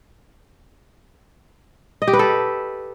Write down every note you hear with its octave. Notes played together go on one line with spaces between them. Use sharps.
D#5
G4
B4
A4